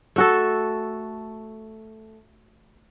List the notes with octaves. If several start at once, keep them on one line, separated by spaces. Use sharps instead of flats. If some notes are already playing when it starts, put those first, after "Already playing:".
A3 F#4 A4